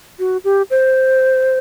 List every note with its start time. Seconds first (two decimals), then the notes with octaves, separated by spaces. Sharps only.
0.19 F#4
0.44 G4
0.70 C5